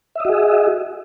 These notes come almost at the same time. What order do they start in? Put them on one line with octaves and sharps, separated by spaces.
E5 D#5 F#4 G#4